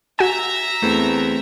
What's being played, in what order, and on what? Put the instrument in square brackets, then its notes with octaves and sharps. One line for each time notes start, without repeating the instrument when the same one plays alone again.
[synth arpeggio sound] F#4 G#5 [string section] E5 A#5
[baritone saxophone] E2 [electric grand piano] A3 C4